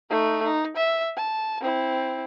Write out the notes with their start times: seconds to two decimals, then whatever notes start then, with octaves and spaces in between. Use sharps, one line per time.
0.10 A3 D#4
0.44 D#4
0.77 E5
1.17 A5
1.61 C4 E4